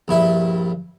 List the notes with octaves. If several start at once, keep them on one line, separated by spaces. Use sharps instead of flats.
A#1 G2 E4